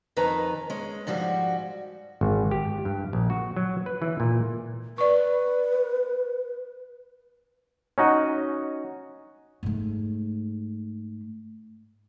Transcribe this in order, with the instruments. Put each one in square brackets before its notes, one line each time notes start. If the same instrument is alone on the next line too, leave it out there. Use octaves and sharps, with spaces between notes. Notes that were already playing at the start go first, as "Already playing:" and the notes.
[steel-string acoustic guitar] F2 D#3 B4 G#5 A#5
G#3 C#4
G#2 F3 G3 F#4
[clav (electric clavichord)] G#1
G4
G2
A#1
F#4
F#3
B4
E3
A#2
[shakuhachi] B4 [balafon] D5 C#6
[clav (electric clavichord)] C#4 D#4 F#4 D#5
[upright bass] G#2 A3